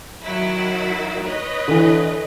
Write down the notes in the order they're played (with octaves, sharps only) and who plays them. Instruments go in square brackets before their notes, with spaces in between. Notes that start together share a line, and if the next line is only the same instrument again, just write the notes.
[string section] D#3 F#3 E4
B4 C#5 D#5
[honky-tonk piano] D3 E3